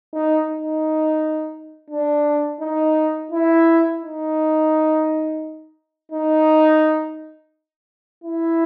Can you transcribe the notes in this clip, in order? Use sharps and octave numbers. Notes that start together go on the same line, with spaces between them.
D#4
D#4
D4
D#4
E4
D#4
D#4
E4